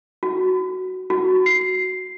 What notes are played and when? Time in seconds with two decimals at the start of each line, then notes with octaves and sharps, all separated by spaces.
0.23 F#4
1.10 F#4
1.46 C7